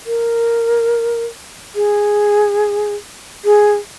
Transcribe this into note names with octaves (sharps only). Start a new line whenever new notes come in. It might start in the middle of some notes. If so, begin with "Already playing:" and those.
A#4
G#4
G#4